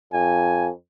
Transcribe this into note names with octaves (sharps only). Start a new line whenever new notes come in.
F2 G#5